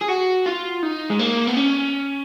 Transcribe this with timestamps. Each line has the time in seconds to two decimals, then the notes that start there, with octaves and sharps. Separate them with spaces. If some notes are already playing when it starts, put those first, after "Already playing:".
0.02 G#4
0.09 F#4
0.46 F4
0.83 D#4
1.10 G#3
1.19 A#3
1.47 B3
1.57 C#4